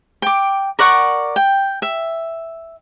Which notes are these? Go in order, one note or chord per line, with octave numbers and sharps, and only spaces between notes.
G5 D6
A#4 D5 F#5 C#6
G5
E5